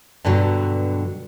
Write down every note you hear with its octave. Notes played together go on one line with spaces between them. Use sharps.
G2 B2 D3 F#3